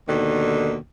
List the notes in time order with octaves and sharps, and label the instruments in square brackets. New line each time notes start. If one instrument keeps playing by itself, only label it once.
[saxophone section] D#2 B2 D3 D#3